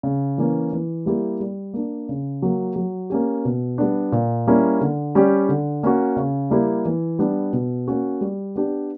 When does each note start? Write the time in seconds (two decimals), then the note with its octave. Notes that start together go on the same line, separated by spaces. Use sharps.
0.03 C#3
0.38 E3 A#3 C#4
0.73 E3
1.06 G3 A#3 E4 G4
1.40 G3
1.74 A#3 D4
2.09 C#3
2.42 F#3 A#3
2.76 F#3
3.10 A#3 C#4 G4
3.45 B2
3.78 G3 B3 D4
4.12 A#2
4.47 G3 A#3 C#4 E4
4.81 D3
5.15 G3 C#4 G4
5.49 D3
5.83 A#3 C#4 F#4
6.16 C#3
6.50 G3 A#3 E4 G4
6.85 E3
7.19 G3 B3 D4
7.53 B2
7.88 A#3 C#4 F#4
8.21 G3
8.56 B3 D4 G4